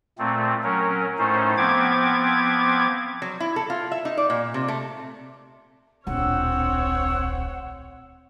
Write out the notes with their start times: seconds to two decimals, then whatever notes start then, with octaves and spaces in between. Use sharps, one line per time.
0.18 A#2 A3 C4
0.63 F#3 C#4 A#4
1.18 A2 A3 C#4 D#4 C5
1.57 F3 B3 C4 D6 G#6
3.22 F#3
3.40 E4
3.56 A4
3.70 F4
3.92 E5
4.05 D#4
4.18 D5
4.30 A#2
4.54 C3
4.68 A3
6.07 D1 A#1 C4 C#5 F#5 E6